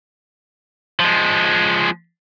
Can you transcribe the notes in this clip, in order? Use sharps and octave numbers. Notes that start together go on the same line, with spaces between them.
F3 G#3